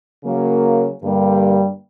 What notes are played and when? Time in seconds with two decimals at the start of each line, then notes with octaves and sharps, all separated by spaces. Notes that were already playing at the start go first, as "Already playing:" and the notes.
0.23 C#3 F#3 A#3
1.02 G2 D3 G3 A#3